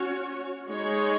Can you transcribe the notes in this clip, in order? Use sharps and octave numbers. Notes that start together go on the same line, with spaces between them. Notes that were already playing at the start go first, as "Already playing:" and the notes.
Already playing: C#4 F#4 C#5
G#3 D#4 G#4 C#5